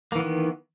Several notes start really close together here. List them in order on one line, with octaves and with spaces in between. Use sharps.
A#3 E3 B3 D#3